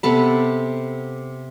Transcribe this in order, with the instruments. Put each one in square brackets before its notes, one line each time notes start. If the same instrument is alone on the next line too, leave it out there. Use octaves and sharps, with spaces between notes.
[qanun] C3 B3 A4 B5